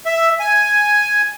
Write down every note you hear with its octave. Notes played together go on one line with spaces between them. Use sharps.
E5
G#5